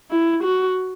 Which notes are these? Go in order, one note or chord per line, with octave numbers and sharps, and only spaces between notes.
E4
F#4